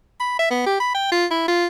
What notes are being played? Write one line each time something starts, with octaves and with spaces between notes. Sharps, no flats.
B5
E5
B3
G4
B5
G5
F4
E4
F4